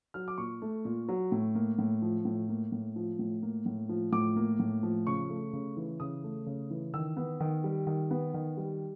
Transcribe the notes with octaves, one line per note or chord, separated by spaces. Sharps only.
F#3 F6
D6
A#2 C#6
A3
A#2
F#3
A2
A#3
A2
F3
A2
A#3
A2
F3
A2
A#3
A2
F3
A2 D6
A#3
A2
F3
C#3 C#6
A3
C#3
E3
C#3 D#6
A3
C#3
E3
D#3 E6
B3
D#3
G3
D#3
B3
D#3
G3